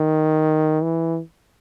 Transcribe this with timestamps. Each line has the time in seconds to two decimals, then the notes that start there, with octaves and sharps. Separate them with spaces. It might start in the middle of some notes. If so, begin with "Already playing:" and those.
Already playing: D#3
0.83 E3